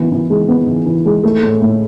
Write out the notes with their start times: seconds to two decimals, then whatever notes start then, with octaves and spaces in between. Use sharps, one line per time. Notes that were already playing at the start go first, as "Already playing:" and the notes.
Already playing: E3 B3
0.12 E3
0.30 G#3
0.48 B3
0.67 E3
0.86 E3
1.05 G#3
1.23 A3
1.42 A2
1.61 A2